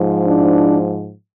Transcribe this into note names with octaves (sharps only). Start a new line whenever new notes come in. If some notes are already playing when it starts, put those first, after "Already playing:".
Already playing: G#2 F3
D4 E4